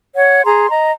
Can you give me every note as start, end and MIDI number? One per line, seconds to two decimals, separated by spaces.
0.15 0.42 73
0.15 0.42 78
0.45 0.69 68
0.45 0.69 82
0.45 0.69 84
0.69 0.92 75
0.69 0.92 82